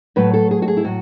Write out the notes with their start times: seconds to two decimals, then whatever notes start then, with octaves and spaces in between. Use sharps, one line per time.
0.16 A2 F#3 A3 B4
0.34 A4
0.51 G#4
0.62 F#4
0.68 G#4
0.77 E4
0.84 A2 F#3 F#4